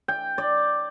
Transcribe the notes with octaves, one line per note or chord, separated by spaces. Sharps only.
G5
D5